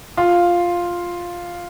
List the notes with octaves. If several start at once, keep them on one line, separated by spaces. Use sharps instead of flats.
F4